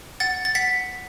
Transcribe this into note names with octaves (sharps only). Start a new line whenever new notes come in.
F#5 A6
A6
F#5 B6